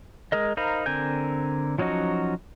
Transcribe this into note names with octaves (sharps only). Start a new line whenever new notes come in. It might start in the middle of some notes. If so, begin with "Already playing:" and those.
G#3 G#4 A#4 D#5
D#4 A#4 C5 F5 B5
D3 C4 A#4 G#5 G6
F3 F#3 C#4 D#4 F#4